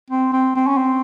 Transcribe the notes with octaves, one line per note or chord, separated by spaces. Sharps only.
C4
C4
C4
C#4
C4